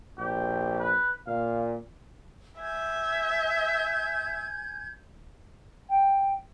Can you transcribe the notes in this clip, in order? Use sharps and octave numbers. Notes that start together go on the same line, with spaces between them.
A#1 G4
B4
A#2 F5
E5 G#5 G6 G#6
G5